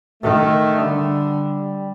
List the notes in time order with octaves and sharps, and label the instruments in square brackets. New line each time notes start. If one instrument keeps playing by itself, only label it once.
[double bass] D#3 [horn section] A3
[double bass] D3 [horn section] G3